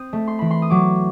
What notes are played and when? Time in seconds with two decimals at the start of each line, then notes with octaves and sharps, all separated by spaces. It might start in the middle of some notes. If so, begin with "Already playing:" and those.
Already playing: C4 D#6
0.13 A3
0.27 C6
0.39 E3 B5
0.51 C6
0.62 D#6
0.70 F#3 D6